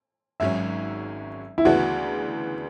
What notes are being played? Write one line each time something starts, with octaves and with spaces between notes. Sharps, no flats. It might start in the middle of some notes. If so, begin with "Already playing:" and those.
G#1 G#2 F#3 C#4 E5
E4
D2 C#3 E3 B3 D4 F#4